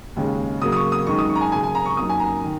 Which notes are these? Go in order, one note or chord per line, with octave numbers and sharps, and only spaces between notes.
D#2 C#3 G#3 C#4
C#3 F#3 A#3 D#6
D#6
C#6
D#6
F#2 D#3 G#3 D#4 C#6
D#6
C#6
A#5
G#5
F#2 C#3 A#3 G#5
G#5
A#5
C#6
F#2 F#3 A#3 D#4 D#6
G#5
A#5
D#3